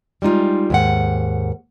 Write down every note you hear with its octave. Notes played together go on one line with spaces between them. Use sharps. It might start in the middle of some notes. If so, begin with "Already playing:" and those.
G3 G#3 D#4 F4
D#2 G#2 F#5